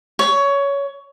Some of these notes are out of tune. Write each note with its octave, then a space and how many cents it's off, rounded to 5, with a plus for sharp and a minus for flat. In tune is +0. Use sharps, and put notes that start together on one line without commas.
C#5 +15